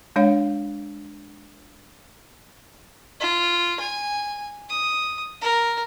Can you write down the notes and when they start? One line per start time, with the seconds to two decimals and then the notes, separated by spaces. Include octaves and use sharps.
0.16 G#3 D4 C#5 F5
3.21 F4
3.80 G#5
4.70 D#6
5.41 A#4